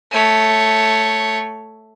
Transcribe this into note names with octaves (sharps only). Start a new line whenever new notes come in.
A3 C#5